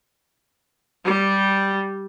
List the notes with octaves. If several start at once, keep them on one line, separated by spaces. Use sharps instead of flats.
G3